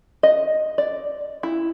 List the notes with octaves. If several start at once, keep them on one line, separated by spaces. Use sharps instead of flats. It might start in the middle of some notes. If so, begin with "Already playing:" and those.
D#5
D5
E4